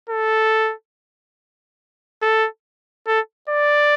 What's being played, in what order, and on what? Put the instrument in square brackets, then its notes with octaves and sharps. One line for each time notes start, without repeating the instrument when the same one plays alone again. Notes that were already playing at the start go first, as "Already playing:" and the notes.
[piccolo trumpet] A4
A4
A4
D5